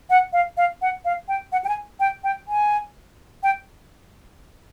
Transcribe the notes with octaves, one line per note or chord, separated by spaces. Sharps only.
F#5
F5
F5
F#5
F5
G5
F#5
G5
G#5
G5
G5
G#5
G5